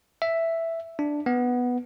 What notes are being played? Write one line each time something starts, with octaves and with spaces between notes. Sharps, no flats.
E5
D4
B3